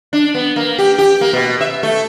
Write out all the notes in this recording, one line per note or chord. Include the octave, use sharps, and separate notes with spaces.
D4
B3
A#3
G4
G4
A#3
B2
E5
A3